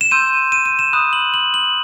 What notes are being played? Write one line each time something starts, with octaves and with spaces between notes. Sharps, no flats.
E7
C6 E6 G6 D#7
D#7
D#7
E7
B5 D#6 F#6 E7
F#7
F#7
F#7